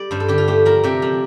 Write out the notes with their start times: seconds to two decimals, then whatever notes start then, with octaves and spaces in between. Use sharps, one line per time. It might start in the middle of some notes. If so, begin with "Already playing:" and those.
Already playing: G3 D5
0.11 G2 C5
0.20 A4
0.28 D3 G4
0.38 F4
0.48 A3 G4
0.65 F3 A#4
0.83 C3 G4
1.02 F3